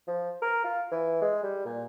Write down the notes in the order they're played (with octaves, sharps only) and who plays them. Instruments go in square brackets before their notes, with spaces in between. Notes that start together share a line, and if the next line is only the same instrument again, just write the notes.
[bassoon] F3
A#4
F4
E3
G#3
G3
A#2